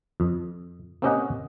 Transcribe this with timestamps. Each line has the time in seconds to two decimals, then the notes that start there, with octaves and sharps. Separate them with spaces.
0.20 F2
1.02 A#3 C4 C#4 G4 D#5 F#5